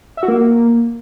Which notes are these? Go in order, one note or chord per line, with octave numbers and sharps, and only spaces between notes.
E5
F#4
A#3